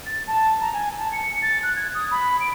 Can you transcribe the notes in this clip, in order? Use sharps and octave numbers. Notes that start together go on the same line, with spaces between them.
A6
A5
A#5
G#5
A5
C#7
A6
F#6
G#6
D#6
B5
D7